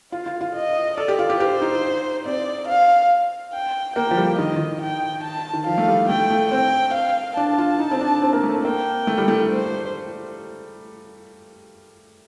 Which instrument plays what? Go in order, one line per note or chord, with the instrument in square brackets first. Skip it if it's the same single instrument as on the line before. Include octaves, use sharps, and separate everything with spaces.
[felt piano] F4 [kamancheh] F5
[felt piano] F4
F4
[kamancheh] D#5
[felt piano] A4 [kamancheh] D5
[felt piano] G4
F4
G4
[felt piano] G4 [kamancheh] C5
[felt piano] D#4
[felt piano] C4 [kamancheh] D5
[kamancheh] F5
G5
[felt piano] A#3 [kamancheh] G5
[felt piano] F3
G3
[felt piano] D#3 [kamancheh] D#5
[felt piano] D#3
[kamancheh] G5
A5
[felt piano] D#3
[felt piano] F3 [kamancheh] F5
[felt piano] A3
G3
[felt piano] A3 [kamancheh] G5
[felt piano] A3
[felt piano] C4 [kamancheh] G5
[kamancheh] F5
[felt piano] D4 [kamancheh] A5
[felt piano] F4
D#4
C4
D4
C4
A#3
A3
C4
[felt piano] A#3 [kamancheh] G5
[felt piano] A3
G3
A3
[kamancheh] C5